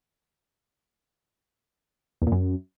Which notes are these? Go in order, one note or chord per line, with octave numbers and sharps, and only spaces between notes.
E2
A#2
F#2